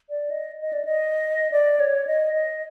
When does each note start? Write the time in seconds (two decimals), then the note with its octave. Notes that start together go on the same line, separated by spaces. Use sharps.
0.10 D5
0.30 D#5
0.61 D#5
0.73 D5
0.85 D#5
1.52 D5
1.80 C#5
2.07 D#5
2.34 D#5